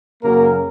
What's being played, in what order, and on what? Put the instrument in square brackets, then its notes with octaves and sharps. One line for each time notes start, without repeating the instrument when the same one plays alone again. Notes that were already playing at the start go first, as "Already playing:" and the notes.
[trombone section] F#2 C#3 F#3 A#3 A#4